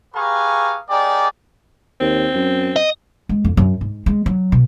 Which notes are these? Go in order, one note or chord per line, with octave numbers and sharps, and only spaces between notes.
G4 G#4 B4 F5 A#5 C#6
A#3 D#4 G4 G#4 D5
D#2 C4
F#2
D#5
G#3
F2
F#2
G#2
G#3
F#3
B2